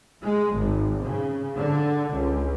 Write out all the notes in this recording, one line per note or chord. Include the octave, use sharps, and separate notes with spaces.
G#3
G#1
C#3
D3
C#2